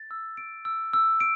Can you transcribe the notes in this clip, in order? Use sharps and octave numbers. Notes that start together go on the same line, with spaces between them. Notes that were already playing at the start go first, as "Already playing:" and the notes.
Already playing: A6
E6
D7
E6
E6
D7